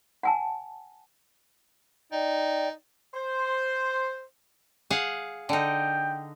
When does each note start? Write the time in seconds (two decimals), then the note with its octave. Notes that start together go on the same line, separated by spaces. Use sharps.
0.23 F#5 G#5 A5
2.12 D#4 D5 G5
3.13 C5
4.90 G#4 F5 F#5
5.49 D3 D#4 G5